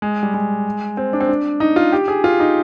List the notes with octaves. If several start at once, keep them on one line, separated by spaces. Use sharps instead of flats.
G#3
G3
G#3
C4
D4
C4
D4
D#4
F4
G4
G#4
F4
D#4